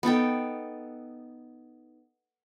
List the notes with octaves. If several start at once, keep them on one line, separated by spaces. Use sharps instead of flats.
B3 D#4 A4 G5